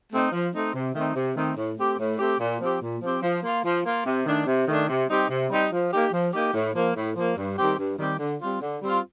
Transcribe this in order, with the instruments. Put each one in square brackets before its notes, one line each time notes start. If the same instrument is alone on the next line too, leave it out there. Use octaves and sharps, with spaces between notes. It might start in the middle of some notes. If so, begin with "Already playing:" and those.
[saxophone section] A3 C4 D#4
F3
A3 C4 D#4
C3
D#3 A3 C4 D#4
C3
D#3 A3 C4 D#4
A2
A3 C4 G4
A2
A3 C4 G4
A#2
F3 C4 G4
A#2
F3 C4 G4
F3
A#3 F4
F3
A#3 F4
C3
D#3 A3 D4
C3
D#3 A3 D4
C3
G3 C4 D#4 G4
C3
G3 C4 D#4 G4
F3
A#3 D#4 G4
F3
A#3 D#4 G4
A2
F3 A#3
A2
F3 A#3
G2
D#3 G3 C4 G4
G2
D#3 G3 C4 G4
D3
G3 C4 F4
D3
G3 C4 F4